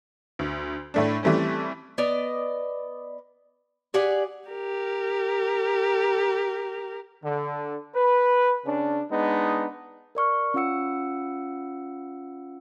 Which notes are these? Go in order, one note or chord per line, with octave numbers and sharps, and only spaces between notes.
D2
A2 A3 D4
E3 G3 A3 C4 C#4
B3 D5 D#5
G4 G#4 D5 F#5
G4 A#4
D3
B4
C#3 C#4 D4
G#3 B3 D4 D#4
A#4 D5 C#6 F6
C#4 F4 F5 F#5 E6 C#7